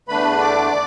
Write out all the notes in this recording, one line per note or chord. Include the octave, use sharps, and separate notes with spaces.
E2 D3 A3 D4 B4 B5
D5 D6